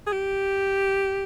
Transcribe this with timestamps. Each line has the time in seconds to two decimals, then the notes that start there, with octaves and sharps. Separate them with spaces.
0.07 G#4
0.13 G4